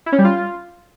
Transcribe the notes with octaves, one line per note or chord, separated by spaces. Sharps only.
E4
C#4
G3
F4